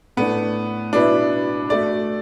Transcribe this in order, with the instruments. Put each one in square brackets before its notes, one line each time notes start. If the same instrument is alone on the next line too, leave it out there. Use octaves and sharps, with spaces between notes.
[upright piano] A2 A3 D4 [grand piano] B3
[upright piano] B2 B3 E4 B4 E5 [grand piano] D4
[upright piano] A3 F#4 A4 E5 [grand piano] D5